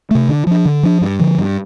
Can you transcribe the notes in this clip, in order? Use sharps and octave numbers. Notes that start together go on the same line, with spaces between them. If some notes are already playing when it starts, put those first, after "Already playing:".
C3 A3
D3
F3 D4
D3
F3 D4
G2
D3 F3
G2